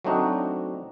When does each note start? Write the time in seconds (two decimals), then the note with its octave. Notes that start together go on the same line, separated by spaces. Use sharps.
0.05 F#3 A3 C4 D4 D#4 F#4